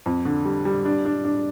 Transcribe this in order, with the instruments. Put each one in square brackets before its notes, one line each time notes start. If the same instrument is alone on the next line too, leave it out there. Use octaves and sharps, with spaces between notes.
[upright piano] F2
D3
G3
G3
D4
D4
D4